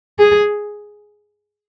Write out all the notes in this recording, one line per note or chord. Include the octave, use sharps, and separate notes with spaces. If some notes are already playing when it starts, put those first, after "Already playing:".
G#4